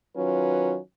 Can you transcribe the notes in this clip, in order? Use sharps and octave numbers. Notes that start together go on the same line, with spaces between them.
D#3 F#3 C#4 F4 B4